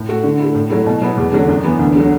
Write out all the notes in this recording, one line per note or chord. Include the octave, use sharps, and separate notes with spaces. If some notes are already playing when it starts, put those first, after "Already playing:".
Already playing: A2
A3 F#4
D3
A3 E4
A2
F#3 A3 E4
B2
F#3 B3 E4
E2
D3 F#3 A3 D4
F#2
E3 B3
D2
D3 F#3